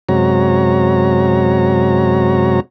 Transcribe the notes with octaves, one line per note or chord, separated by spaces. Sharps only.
F#2 C3 G#3 F#4 C#5 A#5